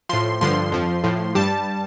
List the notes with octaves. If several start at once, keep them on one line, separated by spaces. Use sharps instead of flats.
A2 F3 C6
G2 D3 F3 C6
F2 F3
A2 F3
G2 G3 A5